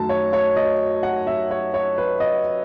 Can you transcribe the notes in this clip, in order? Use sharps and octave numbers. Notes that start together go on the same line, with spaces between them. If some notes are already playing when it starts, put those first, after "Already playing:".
Already playing: F#2 D#3 F#3 A3 D#4 A5
C#5
C#5
D#5
F#5
E5
C#5
C#5
B4
D#5